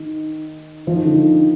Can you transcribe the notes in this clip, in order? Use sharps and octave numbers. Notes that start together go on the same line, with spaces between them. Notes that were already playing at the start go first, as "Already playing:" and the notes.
Already playing: D#3
F3
D#3
D3
D#3